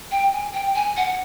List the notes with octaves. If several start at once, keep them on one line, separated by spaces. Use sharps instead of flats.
G5
G#5
G5
G#5
F#5